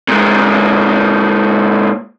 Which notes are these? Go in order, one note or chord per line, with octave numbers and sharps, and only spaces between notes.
A#2 G#3